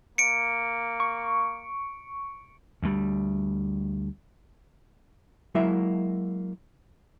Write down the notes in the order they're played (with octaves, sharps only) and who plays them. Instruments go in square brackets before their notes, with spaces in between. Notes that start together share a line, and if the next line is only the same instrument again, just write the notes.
[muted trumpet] A#3 [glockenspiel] C#7 D7
[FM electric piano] C#6
[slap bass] D2 G3
[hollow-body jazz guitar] F#3 G#3 A#3 E4 E5